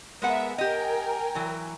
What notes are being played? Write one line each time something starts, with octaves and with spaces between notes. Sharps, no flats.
G#3 B3 A#4 E5 F#5
G4 A#4 D#5 G5 G#5
E3 F#3